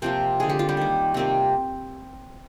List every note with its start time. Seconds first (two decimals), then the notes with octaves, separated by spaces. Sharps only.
0.02 C3 F3 A#3 C4 C5
0.40 D3 G#3 G#4
0.49 G4
0.59 F4
0.69 G3 G4
0.77 D#3 A#3
1.14 C3 G3 A#3 C4